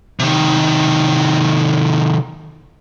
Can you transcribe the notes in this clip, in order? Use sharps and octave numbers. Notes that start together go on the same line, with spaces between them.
C3 D#3